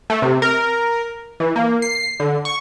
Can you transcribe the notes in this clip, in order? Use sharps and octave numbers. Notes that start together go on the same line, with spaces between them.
A3
C3
A#4
E3
A#3
C7
D3
C#6